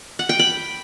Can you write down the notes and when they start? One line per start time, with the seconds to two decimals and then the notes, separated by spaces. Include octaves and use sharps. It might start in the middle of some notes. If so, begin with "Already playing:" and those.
0.19 F#5
0.29 G5
0.39 B5